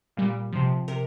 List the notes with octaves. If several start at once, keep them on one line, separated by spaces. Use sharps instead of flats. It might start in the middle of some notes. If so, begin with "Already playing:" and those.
A#2 G3
C3 F3
C3 A#4